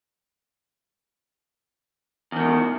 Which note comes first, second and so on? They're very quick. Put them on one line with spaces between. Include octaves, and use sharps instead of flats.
E2 D#3 B2